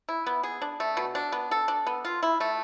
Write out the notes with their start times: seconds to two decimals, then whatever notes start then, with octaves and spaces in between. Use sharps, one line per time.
0.09 E4
0.26 B3
0.43 G#4
0.62 D4
0.80 A3
0.97 B2
1.15 D4
1.32 B3
1.51 A4
1.68 D4
1.87 B3
2.05 F4
2.23 E4
2.40 A3